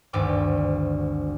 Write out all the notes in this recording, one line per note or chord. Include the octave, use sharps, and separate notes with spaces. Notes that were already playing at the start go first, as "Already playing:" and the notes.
G#1 D2 G2 D6